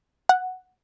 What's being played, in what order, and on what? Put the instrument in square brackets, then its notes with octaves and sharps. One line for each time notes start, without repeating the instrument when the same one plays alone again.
[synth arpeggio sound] F#5